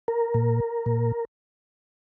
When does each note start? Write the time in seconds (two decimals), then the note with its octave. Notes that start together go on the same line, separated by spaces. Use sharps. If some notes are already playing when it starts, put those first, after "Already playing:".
0.08 A#4
0.34 A#2
0.86 A#2